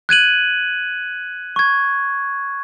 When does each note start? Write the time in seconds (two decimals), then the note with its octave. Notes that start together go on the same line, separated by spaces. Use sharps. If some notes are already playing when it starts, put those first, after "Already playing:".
0.09 F#6 G#6 D#7 F#7
1.56 C#6 G#6